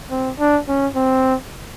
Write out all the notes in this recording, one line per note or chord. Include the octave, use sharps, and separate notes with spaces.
C4
D4
C#4
C4